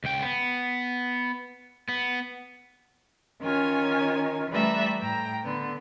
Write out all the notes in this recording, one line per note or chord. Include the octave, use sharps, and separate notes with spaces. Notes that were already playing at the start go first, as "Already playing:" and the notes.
C#2 G5
B3
B3
D#3 C#4 F4 C#5 G#5
E3 G3 A3 B4 E5 A#5
A2 G5 A#5
D3 B3